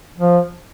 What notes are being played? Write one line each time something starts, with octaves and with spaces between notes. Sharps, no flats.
F3